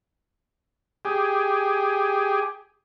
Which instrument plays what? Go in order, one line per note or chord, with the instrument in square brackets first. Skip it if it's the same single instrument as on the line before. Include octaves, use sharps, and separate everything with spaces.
[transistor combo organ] G4 G#4